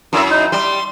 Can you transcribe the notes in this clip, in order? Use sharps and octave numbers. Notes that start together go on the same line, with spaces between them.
F#2 E4 E5
D#4
G3 C6